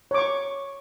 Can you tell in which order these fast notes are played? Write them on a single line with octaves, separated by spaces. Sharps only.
C#5 D6 C#6